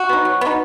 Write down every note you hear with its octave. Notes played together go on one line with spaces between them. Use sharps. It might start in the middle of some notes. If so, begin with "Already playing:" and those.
Already playing: F#4
B3 D#4
F#3
B3
D#4